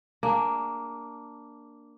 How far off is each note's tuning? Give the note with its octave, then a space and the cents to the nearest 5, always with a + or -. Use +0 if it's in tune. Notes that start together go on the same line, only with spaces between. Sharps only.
A#3 +0 D4 +0 G#4 -10